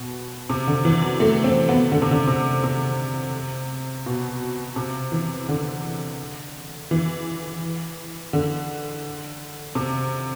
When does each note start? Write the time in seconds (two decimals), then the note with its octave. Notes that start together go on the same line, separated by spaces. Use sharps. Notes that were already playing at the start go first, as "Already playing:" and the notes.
Already playing: B2
0.50 C3
0.67 D3
0.85 E3
1.02 F#3
1.20 A3
1.44 C4
1.69 B3
1.92 D3
2.02 C3
2.11 D3
2.28 C3
2.63 C3
4.06 B2
4.76 C3
5.12 E3
5.49 D3
6.91 E3
8.33 D3
9.75 C3